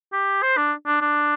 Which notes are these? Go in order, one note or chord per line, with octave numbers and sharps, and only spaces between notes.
G4
C5
D4
D4
D4